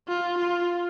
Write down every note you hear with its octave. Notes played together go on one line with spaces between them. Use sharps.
F4
F4